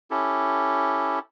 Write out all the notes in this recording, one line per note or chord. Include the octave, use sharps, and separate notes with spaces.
C#4 E4 G4 A4